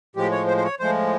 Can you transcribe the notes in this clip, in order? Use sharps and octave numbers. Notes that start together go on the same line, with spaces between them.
A2 F3 G#3 G4
C#5
C5
C5
C#5
A2 F3 G#3 C5